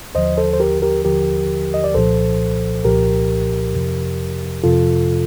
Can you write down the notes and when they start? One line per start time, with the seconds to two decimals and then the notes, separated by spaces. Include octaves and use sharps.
0.15 D#2 D3 F3 C5 D#5
0.37 A4 C5
0.53 C5
0.60 G4 A#4
0.82 G4 A#4
1.05 D#2 D3 F3 G4 A#4
1.74 D#5
1.84 D5
1.95 C2 A#2 F3 A4 C5
2.85 C2 A#2 F3 G4 A#4
3.74 F2 C3 F3
4.64 F2 C3 F3 F4 A4